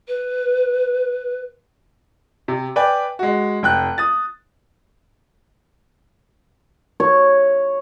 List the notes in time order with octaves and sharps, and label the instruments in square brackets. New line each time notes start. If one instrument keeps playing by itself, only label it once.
[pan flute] B4
[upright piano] C3
B4 D5 G5 G#5
G#3 F#4
F1 G5 F#6
D#6 A6
[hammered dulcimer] C#5